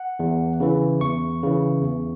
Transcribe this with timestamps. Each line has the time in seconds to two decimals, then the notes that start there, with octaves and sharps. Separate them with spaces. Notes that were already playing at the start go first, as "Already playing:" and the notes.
Already playing: F#5
0.19 E2
0.60 C#3 E3
1.01 E2 C#6
1.43 C#3 E3
1.83 E2